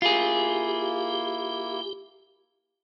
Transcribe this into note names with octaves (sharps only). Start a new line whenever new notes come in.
A#3 E4 F4 G4 G#4